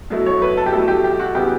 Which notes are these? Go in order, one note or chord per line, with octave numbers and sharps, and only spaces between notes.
B2 F#3 A3 E4
C#5
B4
A4
G4
B2 F#3 A3 E4 A4
G4
G4
F#4
C#3 F#3 B3 E4 G4